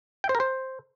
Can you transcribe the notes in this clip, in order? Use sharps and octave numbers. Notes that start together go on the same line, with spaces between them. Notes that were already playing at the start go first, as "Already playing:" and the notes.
G5
C5
A#4
C5